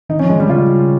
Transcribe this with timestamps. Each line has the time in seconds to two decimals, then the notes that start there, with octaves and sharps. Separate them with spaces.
0.09 D#3 D#4
0.19 C#4
0.22 F3
0.29 G#3
0.36 D#3 G3
0.49 C#3 F4